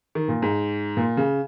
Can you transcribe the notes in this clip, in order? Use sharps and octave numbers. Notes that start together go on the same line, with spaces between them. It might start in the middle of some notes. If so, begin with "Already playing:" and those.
D#3
A#2
G#2
A#2
C#3